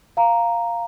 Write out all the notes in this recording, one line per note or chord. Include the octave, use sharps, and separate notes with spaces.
F5 A#5